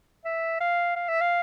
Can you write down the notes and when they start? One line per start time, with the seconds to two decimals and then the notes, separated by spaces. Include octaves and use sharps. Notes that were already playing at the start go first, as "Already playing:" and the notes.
0.25 E5
0.60 F5
0.96 F5
1.08 E5
1.21 F5